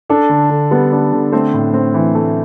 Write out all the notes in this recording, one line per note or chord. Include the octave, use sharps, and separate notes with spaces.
D4 A4
D3
D3
G3 B3 B4
D4
D3
A3 C4 C5
A2
C4
E3
A3